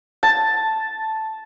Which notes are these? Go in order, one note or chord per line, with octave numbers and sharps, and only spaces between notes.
A5